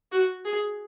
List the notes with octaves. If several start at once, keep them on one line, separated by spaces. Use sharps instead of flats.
F#4
G#4